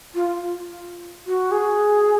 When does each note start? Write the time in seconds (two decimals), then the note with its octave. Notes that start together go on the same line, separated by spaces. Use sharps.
0.15 F4
1.26 F#4
1.51 G#4